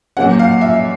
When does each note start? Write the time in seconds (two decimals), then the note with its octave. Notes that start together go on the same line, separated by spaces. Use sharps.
0.17 A#2 F#3 A#3 C#4 F#5
0.39 F5
0.61 E5